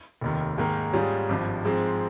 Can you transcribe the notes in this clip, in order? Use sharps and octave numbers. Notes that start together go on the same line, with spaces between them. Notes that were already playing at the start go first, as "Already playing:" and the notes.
F1 D#2 D#3
G#2 D#3 A#3
G#2 G3 C#4 F4 G#4
G#1 G2 F3
G#2 F3 G#3 C4